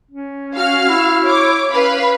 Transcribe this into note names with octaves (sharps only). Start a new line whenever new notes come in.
C#4
F#4 F5 F6
E4
C#5 D6
C#4 B4 F5 B5